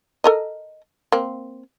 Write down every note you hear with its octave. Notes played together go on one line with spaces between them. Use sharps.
A4 A#4 D#5
A#3 C4